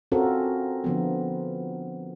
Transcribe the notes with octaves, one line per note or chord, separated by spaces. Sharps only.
C4 C#4 F4 F#4 A4 A#4
D3 F3 B3